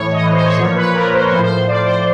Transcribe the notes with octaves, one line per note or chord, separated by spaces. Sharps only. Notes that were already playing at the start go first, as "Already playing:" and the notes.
Already playing: A2 E3 C#5
D#5
A2 E3
C5
C#5
A#2 F3 C#5
B4
A#2 F3 A#4
C5
C#5
A2 F3 C5
C5
A2 F3 D5
C5